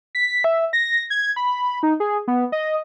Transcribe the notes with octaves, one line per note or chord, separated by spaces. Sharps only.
B6
E5
A#6
G#6
B5
D#4
G#4
B3
D#5